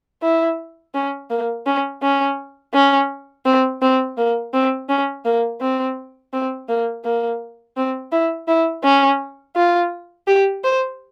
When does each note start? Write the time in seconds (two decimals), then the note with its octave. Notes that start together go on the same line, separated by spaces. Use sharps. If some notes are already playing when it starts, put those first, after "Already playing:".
0.23 E4
0.94 C#4
1.30 A#3
1.66 C#4
2.02 C#4
2.74 C#4
3.46 C4
3.82 C4
4.17 A#3
4.54 C4
4.89 C#4
5.25 A#3
5.61 C4
6.33 C4
6.69 A#3
7.04 A#3
7.77 C4
8.12 E4
8.48 E4
8.84 C#4
9.56 F4
10.27 G4
10.64 C5